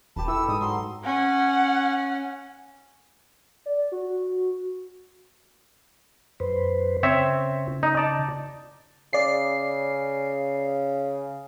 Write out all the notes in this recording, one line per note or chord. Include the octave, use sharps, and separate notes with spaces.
E1 G4 B4 A5
E3 A4 E6
G#2 D#6
F#3 C6
C#4 F#5
D5
F#4
F#2 B4 C5
C#3 C4 C#5 E5
D#4
D5 A5
C#3 D5 C7